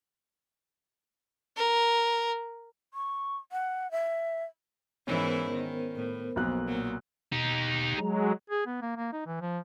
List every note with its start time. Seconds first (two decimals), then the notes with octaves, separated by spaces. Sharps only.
1.57 A#4
2.94 C#6
3.52 F#5
3.91 E5
5.07 G#2 E3 B3 C#4 E4 A#4 C5
5.51 D#3
5.95 A2
6.36 B1 F2 A#3 F#6
6.68 A#2 F#3
7.32 B2 D#4 G4
7.97 F#3 G#3 G#4 A#5
8.50 G#4
8.66 B3
8.82 A#3
8.97 A#3
9.13 D#4
9.26 E3
9.41 F3